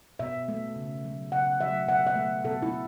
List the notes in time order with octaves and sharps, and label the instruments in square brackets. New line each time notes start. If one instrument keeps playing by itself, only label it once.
[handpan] B2 E5
A3
C#3
F#3 A3
C#3 F#5
F#3 A3 E5
B2 F#5
E5
A3
B2 A4
E4